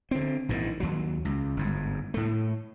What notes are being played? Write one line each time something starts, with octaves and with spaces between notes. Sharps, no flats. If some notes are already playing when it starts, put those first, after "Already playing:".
D3 C4
A#1 G#2 D#3 E3
D#2 F#3
C#2
G1 G#2
A2 A3